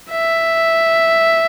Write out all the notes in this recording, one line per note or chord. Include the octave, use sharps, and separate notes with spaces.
E5